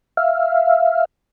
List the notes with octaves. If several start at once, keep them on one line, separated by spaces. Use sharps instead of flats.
E5 F5